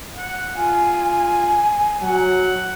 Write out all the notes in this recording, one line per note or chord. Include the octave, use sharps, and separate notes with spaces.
F#5
F4 G#5
F#3 F#5